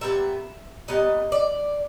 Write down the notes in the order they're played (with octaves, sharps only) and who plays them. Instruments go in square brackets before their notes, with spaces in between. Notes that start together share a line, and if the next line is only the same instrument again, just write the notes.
[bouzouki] A#2 G3 B3 E5
A#2 G3 B3 D#5
D5